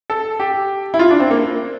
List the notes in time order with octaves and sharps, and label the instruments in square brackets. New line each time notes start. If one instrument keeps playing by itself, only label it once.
[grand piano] A4
G4
E4
F4
D4
C4
A#3